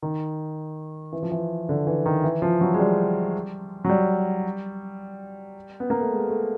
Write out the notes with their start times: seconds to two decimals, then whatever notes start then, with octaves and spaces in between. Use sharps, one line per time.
0.02 D#3
1.13 E3
1.22 F3
1.32 E3
1.69 D3
1.87 E3
2.06 D#3
2.24 E3
2.42 F3
2.61 F#3
2.74 G#3
2.79 G3
3.85 F#3
3.89 G3
5.80 B3
5.90 A#3
6.01 A3
6.11 G#3
6.30 A3